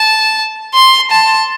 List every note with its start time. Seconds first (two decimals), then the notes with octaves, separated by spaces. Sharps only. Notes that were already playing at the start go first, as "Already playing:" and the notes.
Already playing: A5
0.74 C6
1.11 A5